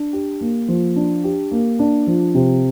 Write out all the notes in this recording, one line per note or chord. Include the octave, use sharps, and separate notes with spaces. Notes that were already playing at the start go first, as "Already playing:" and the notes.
Already playing: D4
G4
A#3
F3
D4
G4
A#3
D4
F3
C3